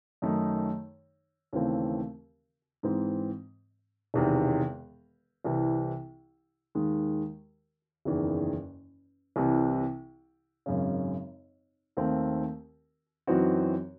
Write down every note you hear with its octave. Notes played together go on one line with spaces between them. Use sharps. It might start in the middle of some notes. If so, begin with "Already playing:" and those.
F#2 D#3 A3 D#4
D#2 C#3 E3 A3 C4
G#2 E3 C4
E1 E2 C3 D#3
C2 C3 E3
D#2 D#3 G#3
F#1 E2 D#3
C2 C3 E3
G#1 F#2 C#3
D#2 D#3 A3 C4
F#2 E3 C4 D#4 F#4